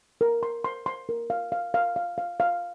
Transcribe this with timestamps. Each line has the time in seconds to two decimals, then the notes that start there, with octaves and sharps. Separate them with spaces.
0.21 A#4
0.43 C6
0.64 C6
0.86 C6
1.09 A#4
1.30 F5
1.52 F5
1.74 F5
1.96 F5
2.18 F5
2.40 F5